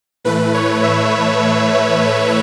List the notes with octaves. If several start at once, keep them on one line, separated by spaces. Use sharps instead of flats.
A2 E3 A3 B4
C#5
E5